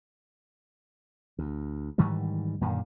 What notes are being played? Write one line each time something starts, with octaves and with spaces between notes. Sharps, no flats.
D2
G#2 D#3 E3 G3
F#2 A#2 D3 D#3